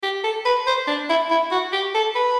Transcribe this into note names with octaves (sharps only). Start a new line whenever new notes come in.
G4
A4
B4
C5
D4
E4
E4
F#4
G4
A4
B4